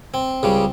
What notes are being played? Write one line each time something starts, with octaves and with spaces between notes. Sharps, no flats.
C4
C#2 C#3 G3